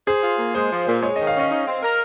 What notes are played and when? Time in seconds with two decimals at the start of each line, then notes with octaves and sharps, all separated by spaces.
0.07 G#4 C5
0.22 F4
0.39 A#3
0.55 G#3 C5
0.71 F3
0.87 A#2
1.03 G#3 C#5
1.16 D#3 D#5
1.27 F5
1.36 C#4 D#5
1.51 D#4
1.67 C4
1.83 A#4